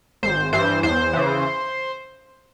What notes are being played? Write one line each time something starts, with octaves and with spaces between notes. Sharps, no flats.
G#1 C5
G2 E3 C5
E2 C5
C#3 E3